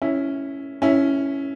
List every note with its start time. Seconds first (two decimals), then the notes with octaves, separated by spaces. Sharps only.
0.02 C#4 E4
0.82 C#4 E4